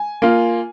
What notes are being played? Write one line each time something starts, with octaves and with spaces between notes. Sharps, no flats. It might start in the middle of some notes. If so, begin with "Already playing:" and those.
Already playing: G#5
A#3 F4